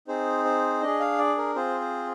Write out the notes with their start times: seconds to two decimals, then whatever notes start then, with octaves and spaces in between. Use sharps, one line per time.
0.08 C4 D#4 G#4 C5
0.45 C5
0.82 D4 G#4 D#5
1.00 F5
1.18 D5
1.38 A#4
1.55 C4 F4 G#4 C5
1.81 C5